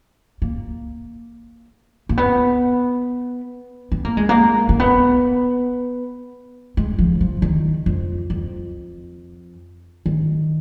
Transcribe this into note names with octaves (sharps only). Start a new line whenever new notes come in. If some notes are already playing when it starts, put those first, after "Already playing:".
A#3
A#3
B3
B3
A#3
G#3
A#3
A#3
B3
G#3
F3
F3
D#3
F2
F2
D#3